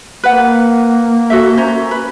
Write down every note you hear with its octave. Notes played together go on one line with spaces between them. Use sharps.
A#3 B4 F#5
F#4 A4 E5
C#4 C5 A#5
B4